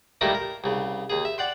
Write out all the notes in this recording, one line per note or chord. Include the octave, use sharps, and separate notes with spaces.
D#3 G3 A3 A#3 E4 A#4
A#4
C2 C#3
D#2 G#4
E5
D5 F#5 G5 C6